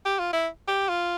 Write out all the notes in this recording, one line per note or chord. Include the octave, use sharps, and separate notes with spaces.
G4
F4
E4
G4
F4